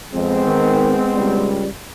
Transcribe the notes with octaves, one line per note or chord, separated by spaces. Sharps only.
F2 G#3 B3 C4
D#3
C#2 G3